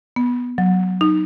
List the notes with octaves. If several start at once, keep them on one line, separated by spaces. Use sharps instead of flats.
B3
F#3
D#4